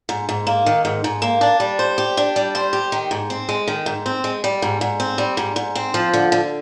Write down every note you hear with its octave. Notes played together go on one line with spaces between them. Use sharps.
G#2
G#2
A#3
D#3
G#2
G#2
A#3
D4
G3
C5
G4
D4
G3
C5
G4
D#3
G#2
C4
G#3
D#3
G#2
C4
G#3
G3
G#2
G#2
C4
G3
G#2
G#2
C4
F3
D3
D3